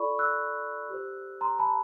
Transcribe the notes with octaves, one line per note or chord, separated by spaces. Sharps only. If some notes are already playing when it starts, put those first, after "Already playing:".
Already playing: F4 A4 D5 B5 C#6
E6 F#6
G4 C5
A#5 C6
A5 B5